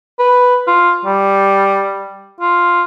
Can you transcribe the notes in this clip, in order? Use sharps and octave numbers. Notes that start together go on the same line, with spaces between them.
B4
F4
G3
F4